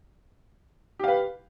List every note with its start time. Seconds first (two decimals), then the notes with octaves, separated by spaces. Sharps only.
0.99 G4
1.04 F5
1.08 B4